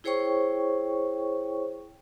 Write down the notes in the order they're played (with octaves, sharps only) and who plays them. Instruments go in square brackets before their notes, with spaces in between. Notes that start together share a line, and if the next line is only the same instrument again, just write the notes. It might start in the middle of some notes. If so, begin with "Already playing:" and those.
[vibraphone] E4 G#4 C5 C#5 G5 C#6